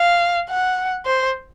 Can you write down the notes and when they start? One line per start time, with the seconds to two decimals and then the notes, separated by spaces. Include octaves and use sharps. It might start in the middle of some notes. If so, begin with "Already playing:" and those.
Already playing: F5
0.49 F#5
1.06 C5